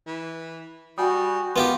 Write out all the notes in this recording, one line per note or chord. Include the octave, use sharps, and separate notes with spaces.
E3
G3 F#4 G5 G#5 D#6
D#3 B3 F4 G4 C6